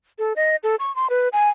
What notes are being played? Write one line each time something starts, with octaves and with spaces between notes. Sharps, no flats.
A4
D#5
A4
C#6
C6
B4
G#5